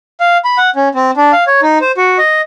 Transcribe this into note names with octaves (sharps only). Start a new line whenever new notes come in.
F5
B5
F#5
C#4
C4
D4
F5
C#5
D#4
C5
F#4
D#5